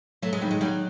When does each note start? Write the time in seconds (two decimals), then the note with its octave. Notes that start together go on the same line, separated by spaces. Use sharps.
0.22 F#3 A3
0.33 G#3
0.41 D#3 G3
0.51 G#3
0.61 F#3 G3